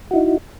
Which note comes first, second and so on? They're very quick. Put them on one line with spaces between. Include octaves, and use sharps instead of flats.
F#4 E4 D#4